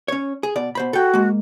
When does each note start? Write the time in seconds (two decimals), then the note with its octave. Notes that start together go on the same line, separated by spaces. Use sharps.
0.08 C#4 C#5
0.43 G#4
0.56 B2 D5
0.75 B2 C5 B5
0.93 F#4 A4 G5
1.14 G#3 A#3